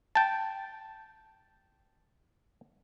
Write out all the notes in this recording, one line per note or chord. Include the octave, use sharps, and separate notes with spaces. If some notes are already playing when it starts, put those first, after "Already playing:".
G5 A5